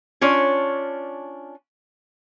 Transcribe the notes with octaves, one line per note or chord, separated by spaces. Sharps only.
C#4 D4 F4 C#5